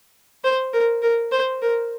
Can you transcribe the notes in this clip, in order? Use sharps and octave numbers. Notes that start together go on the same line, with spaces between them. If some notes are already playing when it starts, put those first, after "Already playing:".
C5
A#4
A#4
C5
A#4